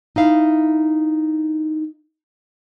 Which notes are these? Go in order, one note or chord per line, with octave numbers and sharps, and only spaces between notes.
D#4 E4 F5